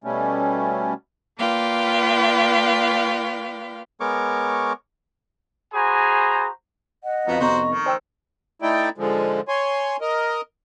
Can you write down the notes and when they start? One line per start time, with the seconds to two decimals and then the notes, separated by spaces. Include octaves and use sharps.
0.04 B2 G3 A3 C#4
1.39 A#3 F4 B4 D5 F5 G5
4.00 G#3 B3 A#4 C#5 C#6 D6
5.73 F#4 G#4 C5 G#5 A#5 B5
7.04 D#5 F#5
7.27 F2 B3 D#4 F#4 F5
7.40 F1 B3 F#4 C5 A#5 C#6
7.70 D#3
7.86 C5 G5 E6
8.62 A3 D#4 E4 D5 G5
8.98 G#2 D3 F3 G#3
9.48 C#5 G#5 C6
10.01 A#4 D#5